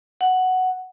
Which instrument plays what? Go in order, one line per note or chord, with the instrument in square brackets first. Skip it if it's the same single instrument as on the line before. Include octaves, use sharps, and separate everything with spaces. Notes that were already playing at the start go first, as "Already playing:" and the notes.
[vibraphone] F#5